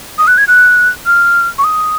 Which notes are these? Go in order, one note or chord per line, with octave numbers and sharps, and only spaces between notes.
D#6
F#6
G#6
F#6
F6
C#6
D#6